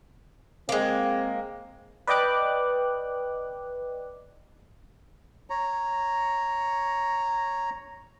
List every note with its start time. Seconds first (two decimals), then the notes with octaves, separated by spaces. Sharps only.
0.69 G#3 A#3 C4
2.07 B4 D5 D#5 G5 D6 F#6
5.50 C#5 A#5